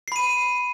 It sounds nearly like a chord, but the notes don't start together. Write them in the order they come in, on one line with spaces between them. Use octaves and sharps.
C7 B5 D#7